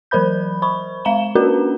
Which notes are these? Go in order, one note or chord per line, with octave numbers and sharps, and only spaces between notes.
E3 F#3 A#4 C5 B5 G6
C5 B5 C#6
G#3 F5 A#5 E7 G7
A#3 C#4 D4 F#4 A#4 B4